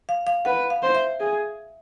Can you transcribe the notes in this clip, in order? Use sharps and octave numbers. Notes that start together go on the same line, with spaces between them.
F5
F5
B4 F#5
F5
C5
E5
G#4